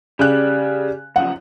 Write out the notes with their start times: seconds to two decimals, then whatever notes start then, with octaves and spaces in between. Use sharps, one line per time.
0.19 C#3 G4 D5 F#6
1.16 F#2 C#3 F3 F#5